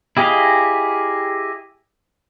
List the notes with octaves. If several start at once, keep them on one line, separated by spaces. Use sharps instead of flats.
E4 G4 G#4 D#5 F5